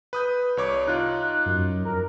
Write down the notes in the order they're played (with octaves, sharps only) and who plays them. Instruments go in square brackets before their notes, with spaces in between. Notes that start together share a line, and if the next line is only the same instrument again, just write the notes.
[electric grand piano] B4 D#6 G6
C2 C#5 D6
[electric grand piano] D#4 F4 [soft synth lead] F#6
[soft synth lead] F#2
A#4